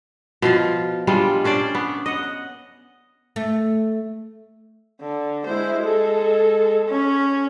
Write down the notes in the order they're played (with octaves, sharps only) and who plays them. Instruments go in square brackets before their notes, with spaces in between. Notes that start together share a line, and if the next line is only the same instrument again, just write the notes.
[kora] B2 F3 F4
G3 G#3 D4 F4
C#4 D4 C5 D5
B3
D#5 F#5
[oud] A3
[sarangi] D3
[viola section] G#3 E4 [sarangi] C5
[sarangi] G#3 [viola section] A4
[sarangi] C#4